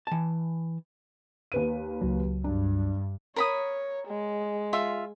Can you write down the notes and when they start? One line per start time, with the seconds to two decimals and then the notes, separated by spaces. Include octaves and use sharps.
0.07 E3 A5
1.52 D#2 B4 D#7
2.01 C#2 F#3
2.44 G2 D4
3.36 A#4 C#5 B5 D#6
4.07 G#3
4.73 F4 E5